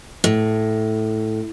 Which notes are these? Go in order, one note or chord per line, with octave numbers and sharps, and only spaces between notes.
A2